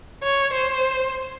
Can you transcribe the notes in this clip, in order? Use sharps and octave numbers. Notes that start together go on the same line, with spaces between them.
C#5
C5